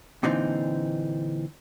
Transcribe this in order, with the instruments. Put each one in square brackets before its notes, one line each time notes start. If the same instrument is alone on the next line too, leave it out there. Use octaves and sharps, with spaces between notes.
[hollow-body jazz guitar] A#2 D3 E3 C4 D#4